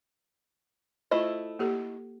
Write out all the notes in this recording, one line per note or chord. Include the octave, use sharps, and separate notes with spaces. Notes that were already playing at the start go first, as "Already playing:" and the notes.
A3 E4 F4 C5 D#5
A#3 G4 A4